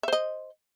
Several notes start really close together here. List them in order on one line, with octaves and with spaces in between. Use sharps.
E5 C5 D#5